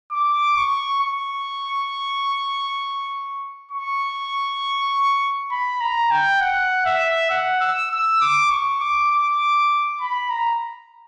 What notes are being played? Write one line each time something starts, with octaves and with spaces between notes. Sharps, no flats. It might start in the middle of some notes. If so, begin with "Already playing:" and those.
D6
C#6
C#6
C#6
B5
A#5
G5
F#5
E5
F#5
E6
E6
D6
C#6
D6
D6
B5
A#5